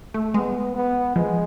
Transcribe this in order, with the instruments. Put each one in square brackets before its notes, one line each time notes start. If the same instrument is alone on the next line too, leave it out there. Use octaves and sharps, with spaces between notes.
[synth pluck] A3
[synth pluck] G#3 [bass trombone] B3
[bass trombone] B3
[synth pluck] F3 [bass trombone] G#3